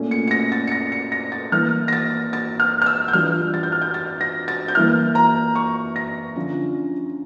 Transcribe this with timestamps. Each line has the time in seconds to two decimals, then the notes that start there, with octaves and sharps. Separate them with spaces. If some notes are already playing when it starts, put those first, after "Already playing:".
Already playing: A#2 A3 C#4
0.11 C#7
0.28 C#7
0.31 A#6
0.52 A6
0.67 C#7
0.72 A#6
0.92 C#7
1.12 A#6
1.32 A6
1.52 E3 A#3 E4 F6
1.88 A#6
1.93 A6
2.33 A6
2.60 F6
2.82 F6
2.86 E6
3.08 G6
3.13 E3 G3 D4 F4 F6
3.54 A6
3.63 G6
3.72 F6
3.82 G6
3.94 A6
4.21 A#6
4.48 A6
4.68 G6
4.75 E3 A#3 E4 F6
5.15 A#5
5.55 C#6
5.96 A#6
6.36 D3 F3 C#4 F4